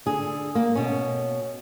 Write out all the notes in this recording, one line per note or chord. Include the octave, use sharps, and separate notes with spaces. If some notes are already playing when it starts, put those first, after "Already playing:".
D3 G#4
A#3
B2 C#4